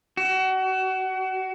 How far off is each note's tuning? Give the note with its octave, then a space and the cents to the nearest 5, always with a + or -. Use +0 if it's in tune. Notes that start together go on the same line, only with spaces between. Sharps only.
F#4 +30